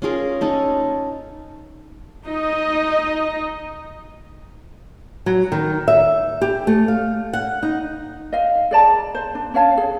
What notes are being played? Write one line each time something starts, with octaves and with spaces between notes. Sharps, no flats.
C#4 F4 G#4 A#4
C#4 D#4 A4
D#4 D#5
F#3
D#3
E5
G4
A3
F5
F#5
D#4
D#5 F5
G#4 D5 A5 A#5
C5
D4
C#4 C#5 F5 A5
G#4